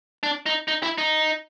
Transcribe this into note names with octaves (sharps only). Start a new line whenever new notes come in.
D4
D#4
D#4
E4
D#4